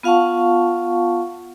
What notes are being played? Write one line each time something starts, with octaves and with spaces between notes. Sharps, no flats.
B3 F4 F5 F#5 A5 C#6